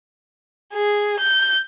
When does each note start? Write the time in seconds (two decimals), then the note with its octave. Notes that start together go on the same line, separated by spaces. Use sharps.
0.74 G#4
1.19 G6